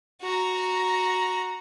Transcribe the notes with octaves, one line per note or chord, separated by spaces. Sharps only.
F#4 A#5